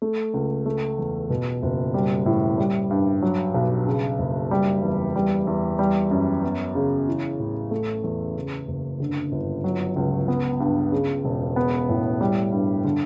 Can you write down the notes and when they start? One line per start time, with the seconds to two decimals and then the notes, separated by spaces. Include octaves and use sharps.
0.02 A3
0.34 C#2
0.66 A3
0.98 E2
1.30 B2
1.62 F#1
1.94 G3
2.26 A2
2.58 G3
2.91 G2
3.22 F#3
3.55 B1
3.87 C#3
4.19 F#1
4.51 G3
4.83 E2
5.16 G3
5.47 E2
5.79 G3
6.11 F#2
6.43 B3
6.75 C#3
7.07 E3
7.40 A1
7.71 A3
8.04 E2
8.36 C#3
8.68 F#1
9.00 D3
9.32 G1
9.64 F#3
9.96 C#2
10.28 B3
10.60 G2
10.92 C#3
11.24 E1
11.56 B3
11.89 A2
12.21 G3
12.52 G2
12.84 D3